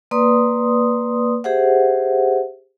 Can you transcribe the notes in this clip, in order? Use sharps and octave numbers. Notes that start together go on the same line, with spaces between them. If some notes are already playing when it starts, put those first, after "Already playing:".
A#3 B4 D5 C6 D#6
G4 G#4 C5 E5 F#5